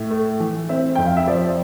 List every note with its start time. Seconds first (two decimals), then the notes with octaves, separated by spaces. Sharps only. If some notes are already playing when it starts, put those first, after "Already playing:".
Already playing: A2 E5
0.10 A3
0.40 E3
0.69 C4 E5
0.95 F2 G5
1.06 F5
1.17 E5
1.27 F3 D5